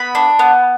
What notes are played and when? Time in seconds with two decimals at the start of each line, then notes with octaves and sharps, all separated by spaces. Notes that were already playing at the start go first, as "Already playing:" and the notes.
Already playing: B3 B5
0.15 D4
0.39 B3